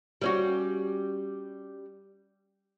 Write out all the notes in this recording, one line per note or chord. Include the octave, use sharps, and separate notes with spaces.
G3 C#4 F#4